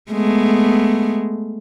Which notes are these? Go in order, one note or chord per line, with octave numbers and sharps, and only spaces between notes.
G#3 A3 B3